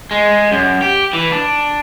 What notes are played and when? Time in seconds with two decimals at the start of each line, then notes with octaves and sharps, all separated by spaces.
0.11 G#3
0.52 F#2
0.82 G4
1.13 E3
1.32 D4